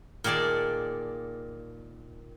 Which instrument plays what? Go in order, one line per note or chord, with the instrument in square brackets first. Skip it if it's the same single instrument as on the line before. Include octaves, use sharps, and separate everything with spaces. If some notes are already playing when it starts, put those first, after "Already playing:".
[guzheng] A#2 D#3 G#4 D5 A5